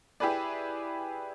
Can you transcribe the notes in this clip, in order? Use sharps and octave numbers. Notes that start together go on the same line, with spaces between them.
E4 G4 G#4 B4 D5